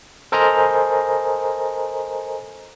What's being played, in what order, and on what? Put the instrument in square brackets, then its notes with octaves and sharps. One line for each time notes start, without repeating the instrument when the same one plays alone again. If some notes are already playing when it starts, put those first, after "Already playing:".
[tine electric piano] A4 A#4 C5 D#5 G#5 A#5